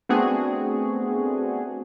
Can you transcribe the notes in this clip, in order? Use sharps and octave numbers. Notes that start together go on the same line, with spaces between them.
A3 B3 C4 D4 F#4 G#4